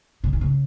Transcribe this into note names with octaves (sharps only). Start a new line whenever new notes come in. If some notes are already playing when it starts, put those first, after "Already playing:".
C#3
D#3
C#3